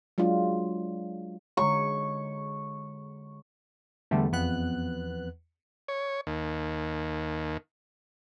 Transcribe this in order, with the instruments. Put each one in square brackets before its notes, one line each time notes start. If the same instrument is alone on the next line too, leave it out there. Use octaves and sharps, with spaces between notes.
[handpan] F#3 G#3 D4 F4
[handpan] D3 G#3 C#5 [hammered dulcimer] C#6
[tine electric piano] E2 [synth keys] D3 G3 A3
[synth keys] F2 B3 F#6
[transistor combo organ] C#5
D#2